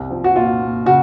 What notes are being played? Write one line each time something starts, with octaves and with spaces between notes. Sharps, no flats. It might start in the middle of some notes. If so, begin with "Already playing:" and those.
Already playing: C2
F3
F#4
A#2 F4
A#2
C#3 F#4